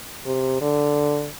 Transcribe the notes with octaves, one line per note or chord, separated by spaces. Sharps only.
C3
D3